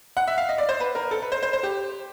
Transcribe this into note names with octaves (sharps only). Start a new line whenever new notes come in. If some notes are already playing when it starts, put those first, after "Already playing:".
F#5
E5
F5
D#5
D5
C5
B4
A#4
A4
B4
C5
C5
C5
G4